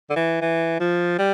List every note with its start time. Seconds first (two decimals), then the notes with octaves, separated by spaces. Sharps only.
0.10 D3
0.16 E3
0.41 E3
0.80 F3
1.18 G3